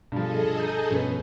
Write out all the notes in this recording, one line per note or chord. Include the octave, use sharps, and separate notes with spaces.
G2 B2 F3 G#4 A4 D#5
A#5 G6
G2 B2 F3 B3 C#4